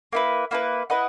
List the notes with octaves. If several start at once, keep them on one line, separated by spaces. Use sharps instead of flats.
A#3 E4 B4
A#3 E4 B4
E4 B4 D#5 F#5